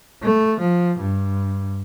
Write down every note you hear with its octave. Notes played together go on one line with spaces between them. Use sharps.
A3
F3
G2